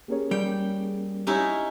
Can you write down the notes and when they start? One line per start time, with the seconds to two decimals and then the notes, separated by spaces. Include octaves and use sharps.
0.08 A#3 C#4 G4 G#4 A#4 C#5
0.31 G3 G5
1.27 C#4 D#4 E4 G4 C#5